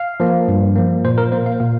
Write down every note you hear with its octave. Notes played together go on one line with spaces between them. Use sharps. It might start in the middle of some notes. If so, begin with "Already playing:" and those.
Already playing: F5
F3 A#3
G2
F3 A#3
A#2 C5
A#4
A#3 C5
F5
A#2 F5